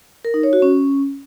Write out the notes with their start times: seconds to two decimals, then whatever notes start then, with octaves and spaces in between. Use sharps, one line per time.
0.25 A#4
0.34 D#4
0.43 C#5
0.53 F#4
0.62 C#4